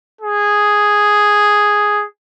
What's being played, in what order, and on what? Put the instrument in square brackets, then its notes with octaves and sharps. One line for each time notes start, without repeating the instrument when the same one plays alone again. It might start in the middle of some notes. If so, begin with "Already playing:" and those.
[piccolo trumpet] G#4